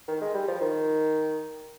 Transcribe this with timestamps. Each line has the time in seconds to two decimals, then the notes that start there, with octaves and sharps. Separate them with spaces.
0.08 D#3
0.22 G#3
0.34 G3
0.48 F3
0.61 D#3